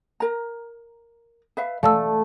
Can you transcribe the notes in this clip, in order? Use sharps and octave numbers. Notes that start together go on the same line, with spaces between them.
A#4 A#5
B4 E5 F5
A3 D5 F5 A5 E6